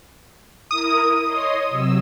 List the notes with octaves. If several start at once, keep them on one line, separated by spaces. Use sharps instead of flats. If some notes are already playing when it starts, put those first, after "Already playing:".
E4 A#4 D#6
C#5 D#5 C6
C3 F#3 E6